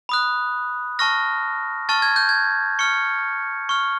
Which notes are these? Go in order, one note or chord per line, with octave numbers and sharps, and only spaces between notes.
B5 D#6 F#6
A5 C#6 F6 A#6
A5 C#6 F6 A6
G#6
G6
G#6
C#6 F6 C#7
C#6 F6